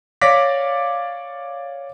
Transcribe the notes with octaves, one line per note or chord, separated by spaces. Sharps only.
C#5 D5 F5 D6 A#6 B6